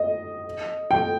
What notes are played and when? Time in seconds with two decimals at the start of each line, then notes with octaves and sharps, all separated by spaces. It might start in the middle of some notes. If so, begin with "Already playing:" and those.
Already playing: D#5
0.91 G5